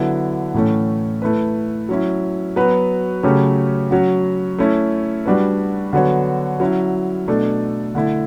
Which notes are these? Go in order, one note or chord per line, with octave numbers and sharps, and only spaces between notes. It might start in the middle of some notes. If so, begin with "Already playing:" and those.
Already playing: D3 F#3 B3 E4
A2 E3 A3 C#4
A3 E4 B4
F#3 C#4 E4
F#3 B3 F#4 B4
C#3 F#3 A3 C#4 G4
F#3 C#4 F#4
A3 C#4 E4
G3 D4 F#4 B4
D3 F#3 B3 F#4 C#5
F#3 C#4 E4
B2 A3 D4 A4
D3 A3 E4